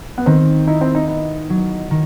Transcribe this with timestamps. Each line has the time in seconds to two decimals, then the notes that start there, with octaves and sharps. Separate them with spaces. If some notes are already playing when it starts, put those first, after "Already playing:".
0.18 B3
0.26 D#3 C4
0.67 D#4 E4
0.81 C4
0.95 D#4
1.08 B3 D#4
1.50 F#3
1.91 D#3